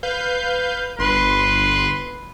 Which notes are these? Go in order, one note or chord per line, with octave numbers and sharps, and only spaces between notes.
B4 F5 G6
G1 B4 C6